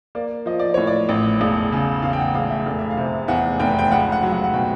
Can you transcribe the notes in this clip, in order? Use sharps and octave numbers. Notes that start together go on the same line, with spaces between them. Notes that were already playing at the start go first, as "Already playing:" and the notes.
A#3 D5
F3 D#5
D5
A2 C#5
D5
A1
E1
C#3
E2 F5
G5
F#5
E1 F5
E5
F1 F5
E5
F5
C3
E2 F#5
F1 G5
G5
C#2 F#5
F#5
F#3
F#5
F#5
B2 G5